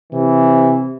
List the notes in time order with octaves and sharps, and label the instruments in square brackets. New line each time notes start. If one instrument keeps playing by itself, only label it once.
[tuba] C3 [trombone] E3